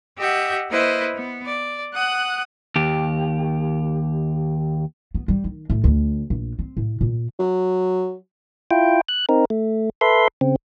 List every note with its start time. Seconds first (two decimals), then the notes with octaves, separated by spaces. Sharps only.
0.18 G4 D#5 E5 F#5 G6
0.70 A#3 E4 B4 C5 D#5
1.15 B3
1.47 D5
1.94 F#5 D#6 F#6
2.76 D#2 G4
5.14 B3
5.28 G3
5.44 D#3
5.70 A2
5.84 D2
6.30 A#1
6.59 C4
6.77 A2
7.01 A#2
7.39 F#3
8.71 E4 F4 G5
9.08 F#6
9.29 C4 D#4 A#4
9.50 A3
10.01 A4 B4 E5 C6
10.41 C#3 C4